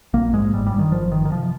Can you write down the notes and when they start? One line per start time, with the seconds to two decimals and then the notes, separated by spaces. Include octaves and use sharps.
0.14 A#1 A#3
0.33 G#2 G#3
0.53 G1 G3
0.67 G3
0.73 G2
0.79 D#3
0.92 G#1 F3
1.12 G2 D#3
1.25 D#3
1.31 C3 F3